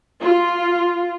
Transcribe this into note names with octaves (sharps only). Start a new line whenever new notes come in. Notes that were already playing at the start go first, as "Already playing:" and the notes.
F4